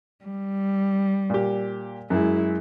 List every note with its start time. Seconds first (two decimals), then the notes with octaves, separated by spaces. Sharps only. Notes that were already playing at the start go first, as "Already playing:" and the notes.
0.25 G3
1.30 A#2 G4
2.10 F#2 G#3 E4